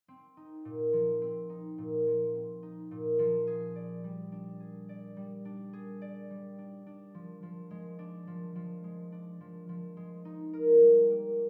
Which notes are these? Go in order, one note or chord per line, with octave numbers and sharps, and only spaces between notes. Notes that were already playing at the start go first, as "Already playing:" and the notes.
C4
D#4
A#2
F3
C4
D#4
A#2
F3
C4
D#4
A#2
F3
G#4
D5
G3
D4
G#4
D5
G3
D4
G#4
D5
G3
D4
D4
F3
F3
G#3
D4
F3
F3
G#3
D4
F3
F3
G#3
D#4
A#4
G3
A#3